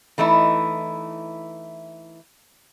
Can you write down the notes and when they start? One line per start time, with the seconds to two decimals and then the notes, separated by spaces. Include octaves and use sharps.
0.18 E3 A3 D#4 E4